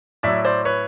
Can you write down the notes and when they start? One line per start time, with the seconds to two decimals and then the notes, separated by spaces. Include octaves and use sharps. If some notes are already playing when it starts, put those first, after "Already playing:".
0.23 A2 F#3 D5 E5
0.45 C5 D5
0.65 B4 C#5